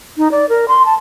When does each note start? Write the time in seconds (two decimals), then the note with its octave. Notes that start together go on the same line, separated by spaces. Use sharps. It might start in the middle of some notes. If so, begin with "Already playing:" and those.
0.18 D#4
0.32 D5
0.49 A#4
0.68 C6
0.85 A5